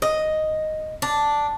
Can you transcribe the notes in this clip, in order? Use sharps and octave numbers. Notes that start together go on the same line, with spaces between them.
D#5
D4